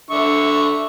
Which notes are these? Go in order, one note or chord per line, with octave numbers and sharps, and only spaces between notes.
D3 E5 C#6